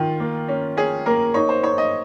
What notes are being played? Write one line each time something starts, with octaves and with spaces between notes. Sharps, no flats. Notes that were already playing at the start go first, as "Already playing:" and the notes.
Already playing: D#3 F4
A#3
C#4
C#4 G#4
A#3 A#4
D#4 C#5
C5
D#4 C#5
D#5